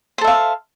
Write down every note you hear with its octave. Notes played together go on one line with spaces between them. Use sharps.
A4 C5 E5 F5